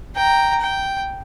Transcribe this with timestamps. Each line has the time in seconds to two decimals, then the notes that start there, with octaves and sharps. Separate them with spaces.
0.16 G5 A#5
0.61 G5